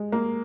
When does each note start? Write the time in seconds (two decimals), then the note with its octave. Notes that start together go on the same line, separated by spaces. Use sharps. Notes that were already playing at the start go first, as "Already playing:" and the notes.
Already playing: G#3
0.12 A#3